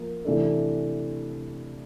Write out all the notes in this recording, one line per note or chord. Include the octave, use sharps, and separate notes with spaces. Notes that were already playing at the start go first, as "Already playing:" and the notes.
Already playing: F3 A#3 A#4
C3 E3 A3 D4 A4